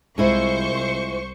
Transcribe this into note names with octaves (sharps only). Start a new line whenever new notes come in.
C2 G#3 E4 F4 C5 C#6